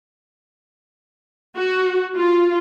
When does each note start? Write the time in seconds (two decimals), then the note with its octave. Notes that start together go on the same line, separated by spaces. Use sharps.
1.56 F#4
2.16 F4